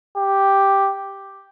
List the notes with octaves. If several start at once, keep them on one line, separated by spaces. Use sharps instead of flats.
G4